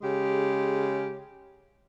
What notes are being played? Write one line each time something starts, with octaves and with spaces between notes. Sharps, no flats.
C#3 G#3 G4